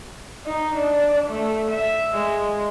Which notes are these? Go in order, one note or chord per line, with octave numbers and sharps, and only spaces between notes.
D#4
D4
A3
E5
G#3